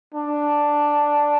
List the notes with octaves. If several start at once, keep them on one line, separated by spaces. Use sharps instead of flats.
D4